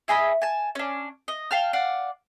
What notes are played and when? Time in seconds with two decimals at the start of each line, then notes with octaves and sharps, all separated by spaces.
0.08 E4 G#4 D#5 B5
0.42 G#5 A5
0.75 C#4 D4
1.28 D#5
1.51 F5 G5 A5 F6
1.73 D5 F5 F#5